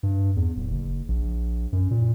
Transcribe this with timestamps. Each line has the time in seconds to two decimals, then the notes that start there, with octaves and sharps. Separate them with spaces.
0.03 G2
0.36 E2
0.56 D1
0.70 F#1
1.08 A#1
1.73 F#2
1.91 A#2